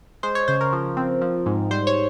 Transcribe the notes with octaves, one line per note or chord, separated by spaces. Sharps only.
G#3 C5
C#5
C#3 C5
A#4
F3
C4
F3
G#2
G3 C5
C#5